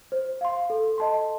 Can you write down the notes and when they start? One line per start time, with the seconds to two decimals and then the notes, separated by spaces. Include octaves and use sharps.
0.12 C5
0.41 F5 C6
0.70 A4
0.98 D#5 A5 C6